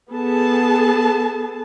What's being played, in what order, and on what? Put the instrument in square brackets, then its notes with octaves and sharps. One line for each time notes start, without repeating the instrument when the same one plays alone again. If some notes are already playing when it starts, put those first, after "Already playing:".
[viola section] B3 G#4 A4 A5